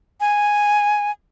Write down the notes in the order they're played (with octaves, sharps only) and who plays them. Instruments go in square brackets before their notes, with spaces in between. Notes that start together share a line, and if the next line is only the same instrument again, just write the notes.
[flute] G#5